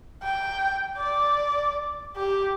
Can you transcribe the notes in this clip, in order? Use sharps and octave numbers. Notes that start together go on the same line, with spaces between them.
G5
D5
G4